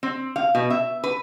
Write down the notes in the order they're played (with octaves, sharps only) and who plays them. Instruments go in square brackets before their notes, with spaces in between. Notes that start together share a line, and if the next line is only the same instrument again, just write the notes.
[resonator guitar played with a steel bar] C4
F5
B2
E5
B4